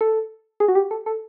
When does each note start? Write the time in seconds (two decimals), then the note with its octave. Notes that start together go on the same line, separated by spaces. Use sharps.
0.01 A4
0.60 G#4
0.68 F#4
0.75 G4
0.91 A4
1.06 A4